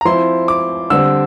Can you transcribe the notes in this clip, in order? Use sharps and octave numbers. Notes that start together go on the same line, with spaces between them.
A#5
F3 C4 E4 C6
D6
D3 G3 C4 E6